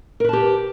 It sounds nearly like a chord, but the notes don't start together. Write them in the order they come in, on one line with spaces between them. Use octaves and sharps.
A#4 B4 A5 G4